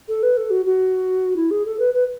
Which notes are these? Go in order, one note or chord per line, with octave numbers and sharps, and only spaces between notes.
A4
B4
A4
F#4
F#4
E4
G#4
A4
B4
B4